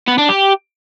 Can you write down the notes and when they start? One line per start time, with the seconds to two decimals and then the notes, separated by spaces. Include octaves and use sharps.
0.08 B3
0.18 D4
0.29 G4